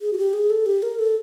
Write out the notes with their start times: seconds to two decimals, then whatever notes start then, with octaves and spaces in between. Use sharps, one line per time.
0.01 G#4
0.13 F#4
0.18 G4
0.33 G#4
0.50 A4
0.66 G4
0.83 A#4
0.99 A4